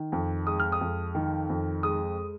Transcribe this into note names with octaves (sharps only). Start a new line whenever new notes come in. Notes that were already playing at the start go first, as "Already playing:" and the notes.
Already playing: D#3
F2
G#3 D#6
F6
D#6
F2
D#3
F2
G#3 D#6